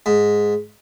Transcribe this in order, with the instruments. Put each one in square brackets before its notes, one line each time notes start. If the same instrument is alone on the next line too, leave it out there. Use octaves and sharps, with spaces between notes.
[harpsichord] G#2